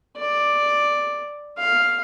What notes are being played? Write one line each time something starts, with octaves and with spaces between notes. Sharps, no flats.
D5
F5